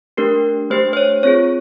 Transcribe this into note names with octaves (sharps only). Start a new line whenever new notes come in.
A3 D4 G4 A#4
A3 D4 G4 C5
C5
C#5
C4 F4 G#4 C#5